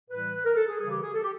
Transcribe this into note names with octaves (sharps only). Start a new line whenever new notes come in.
A2 E3 G3 B4
A#4
A4
G#4
C#3 E3 G3 G#4
G4
G#4
A4
G4